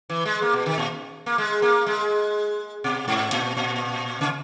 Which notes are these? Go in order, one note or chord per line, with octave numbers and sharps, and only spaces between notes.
E3
G#3
A#3
B2
D#3
A#2
A#3
G#3
A#3
G#3
B2
G#2
A#2
A#2
C#3